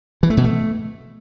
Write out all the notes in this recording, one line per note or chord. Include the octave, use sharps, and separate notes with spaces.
E3
A3
B2
A3